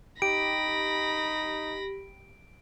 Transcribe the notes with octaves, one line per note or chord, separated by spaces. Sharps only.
D#4 G4 B5 A#6 D7